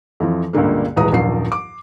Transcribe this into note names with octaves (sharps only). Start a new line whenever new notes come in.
F2 E3 F3
C#2 G2 A#2 D3 A#3
D#1 E3 G#3 B4 A#5 D#6
D#1 A#1 F#2 F3 C7
D6